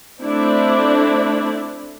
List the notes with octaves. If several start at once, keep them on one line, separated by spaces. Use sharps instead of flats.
A3 C4 D4 E4 D5